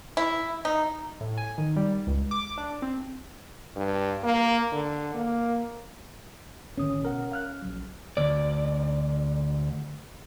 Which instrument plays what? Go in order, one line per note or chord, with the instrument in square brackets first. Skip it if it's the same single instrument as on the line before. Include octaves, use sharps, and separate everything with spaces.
[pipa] E4
D#4
[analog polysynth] A2
G#5
D#3
G3
C#2
D6
D4
C4
[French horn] G2
A#3
D3
A#3
[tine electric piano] G#1 D3 D#6 [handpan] C#4
[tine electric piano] B2 A#4 F#5
F5 F6 F#6
A#1 F#3
[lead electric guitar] D2 D5